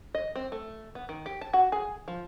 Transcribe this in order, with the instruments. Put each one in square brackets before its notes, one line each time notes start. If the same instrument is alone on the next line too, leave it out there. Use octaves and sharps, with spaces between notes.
[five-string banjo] D#5
C4
A3
B3
D#3
G4
A5
F#4
G#4
F3